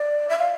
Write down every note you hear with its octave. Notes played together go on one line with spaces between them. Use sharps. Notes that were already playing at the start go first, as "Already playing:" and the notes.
Already playing: D5
E5
F5